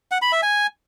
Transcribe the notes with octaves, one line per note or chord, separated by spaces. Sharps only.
F#5
B5
E5
G#5